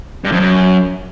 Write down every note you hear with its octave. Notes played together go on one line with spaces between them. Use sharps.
G2
F2
F#2